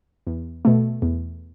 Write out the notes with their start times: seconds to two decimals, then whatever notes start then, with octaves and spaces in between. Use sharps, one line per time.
0.27 E2
0.65 B2 A3
1.02 E2